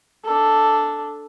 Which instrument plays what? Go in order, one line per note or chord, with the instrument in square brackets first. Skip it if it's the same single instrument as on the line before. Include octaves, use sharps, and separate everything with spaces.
[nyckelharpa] D4 A4